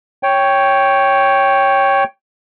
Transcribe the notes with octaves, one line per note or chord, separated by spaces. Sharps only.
C#5 G5